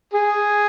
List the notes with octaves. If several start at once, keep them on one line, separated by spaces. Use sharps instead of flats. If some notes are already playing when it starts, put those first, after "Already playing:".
G#4